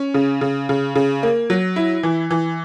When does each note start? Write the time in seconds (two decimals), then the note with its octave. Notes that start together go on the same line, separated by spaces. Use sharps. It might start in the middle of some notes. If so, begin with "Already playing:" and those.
Already playing: C#4
0.14 C#3
0.41 C#3
0.69 C#3
0.95 C#3
1.23 A#3
1.50 F#3
1.76 E4
2.03 E3
2.31 E3